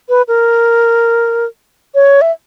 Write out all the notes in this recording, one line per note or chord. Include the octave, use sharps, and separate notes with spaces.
B4
A#4
C#5
E5